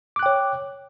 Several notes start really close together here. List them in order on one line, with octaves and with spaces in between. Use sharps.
D6 F#6 G5 C#5